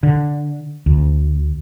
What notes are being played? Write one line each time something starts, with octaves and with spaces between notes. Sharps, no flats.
D3
D2